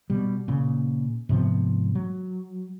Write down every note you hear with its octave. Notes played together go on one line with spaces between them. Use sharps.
B2 G3
A#2 C#3
G#2 C3 F3 B3
F#3